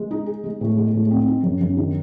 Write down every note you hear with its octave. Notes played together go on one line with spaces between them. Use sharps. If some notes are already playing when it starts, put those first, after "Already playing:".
Already playing: G#3
D#4
G#4
G#3
A2
G#3
A2
C4
D#4
F#2
F#2
D#3